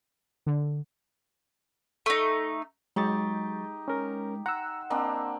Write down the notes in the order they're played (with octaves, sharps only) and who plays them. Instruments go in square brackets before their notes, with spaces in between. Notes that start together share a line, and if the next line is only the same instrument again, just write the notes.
[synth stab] D3
[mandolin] A3 D#4
[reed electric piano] F#3 C#6 A6 [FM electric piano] G#3 [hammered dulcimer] D#4 G4
[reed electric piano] C#4 A#4
[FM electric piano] F#5 E6 [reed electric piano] A#5 [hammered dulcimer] C6
[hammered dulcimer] A#3 C4 D4 [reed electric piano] D#5